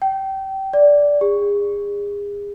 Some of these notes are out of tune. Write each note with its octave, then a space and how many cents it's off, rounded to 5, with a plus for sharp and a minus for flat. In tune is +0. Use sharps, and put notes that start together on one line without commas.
G5 -25
D5 -10
G#4 -35